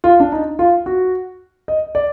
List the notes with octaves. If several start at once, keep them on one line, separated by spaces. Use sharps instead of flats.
F4
D4
D#4
F4
F#4
D#5
D5